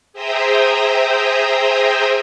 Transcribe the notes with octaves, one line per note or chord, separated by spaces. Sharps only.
G#4 C5 E5 G5 A#5 D#6